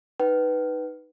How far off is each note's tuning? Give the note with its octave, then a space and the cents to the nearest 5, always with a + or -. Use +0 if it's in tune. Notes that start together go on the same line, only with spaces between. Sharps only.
D#4 +0 B4 +0 G5 -40